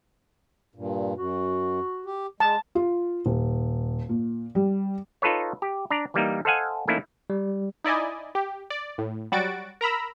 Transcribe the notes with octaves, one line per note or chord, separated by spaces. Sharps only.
G2 A#2
F#2 F#4
G4
G#3 A5
F4
D#1
A#2
G3
D#4 F4 A4 B4 C#5
G4
D4 D5 A#5
E3 G3 A#3 D#4
A4 C5 D#5 F5 F#5 G#5
E3 A3 A#3 C#4 D#4 E4
G3
D#4 E4 D5 D#5 G#5
G4
D5
A2
F#3 G3 F#4 A6 D7
A#4 A#5 B5 E6